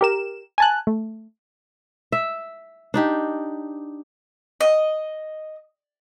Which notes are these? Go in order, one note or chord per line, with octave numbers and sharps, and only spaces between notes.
G4 A#4 E7
G#5 A5 F#6
A3
E5
D4 D#4 G4
D#5